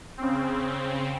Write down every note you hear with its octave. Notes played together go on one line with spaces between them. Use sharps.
C#3 C4